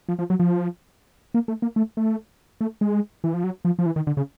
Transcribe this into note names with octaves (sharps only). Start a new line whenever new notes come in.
F3
F3
F#3
F3
A#3
A3
A#3
A3
A3
A3
G#3
E3
F3
F#3
F3
F3
E3
D#3
D3
C#3